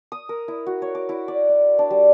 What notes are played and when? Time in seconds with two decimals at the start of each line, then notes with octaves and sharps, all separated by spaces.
0.12 D#6
0.29 A#4
0.48 E4
0.67 F#4
0.82 C#5
0.95 D6
1.09 E4
1.28 D5
1.49 D5
1.79 D4
1.90 G3